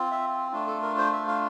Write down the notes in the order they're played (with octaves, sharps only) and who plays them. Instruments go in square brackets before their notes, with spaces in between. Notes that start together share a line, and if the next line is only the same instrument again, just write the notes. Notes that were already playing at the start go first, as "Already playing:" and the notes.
Already playing: [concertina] C4 F4
E5
A3 D4 F4
A4
A#4
C5
E5
F5